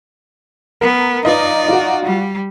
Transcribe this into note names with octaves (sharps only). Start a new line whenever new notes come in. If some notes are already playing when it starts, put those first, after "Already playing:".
B3 A#4
D#4 F4 B4 D5 D#5
F4 F#4
G3